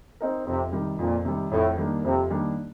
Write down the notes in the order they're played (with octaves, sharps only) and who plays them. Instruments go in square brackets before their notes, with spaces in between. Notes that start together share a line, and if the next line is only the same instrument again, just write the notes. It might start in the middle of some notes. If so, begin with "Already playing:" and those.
[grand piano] C4 D#4 A#4
[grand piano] F2 [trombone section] C3
[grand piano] C3 D#3 G3
[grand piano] F2 [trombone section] A#2
[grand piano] C3 D#3 G3
[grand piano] F2 [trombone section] A2
[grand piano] D#3 G3 A#3 D4
[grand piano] F2 [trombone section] C3
[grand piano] D#3 G3 A#3 D4